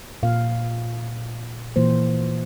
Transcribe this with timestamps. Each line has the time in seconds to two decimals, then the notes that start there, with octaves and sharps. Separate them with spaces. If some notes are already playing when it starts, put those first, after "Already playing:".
0.23 A#2 F5
1.76 A#2 E3 A#3 C5